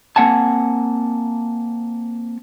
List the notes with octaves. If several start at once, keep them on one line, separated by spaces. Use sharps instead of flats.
A#3 C4 F#5 G#5 A5